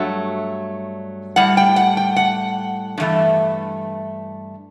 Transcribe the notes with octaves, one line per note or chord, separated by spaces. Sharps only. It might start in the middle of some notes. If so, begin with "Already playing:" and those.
Already playing: G2 F#3 A3 E5
A2 G3 F#5
G5
F#5
G5
F#5
G2 E3 A3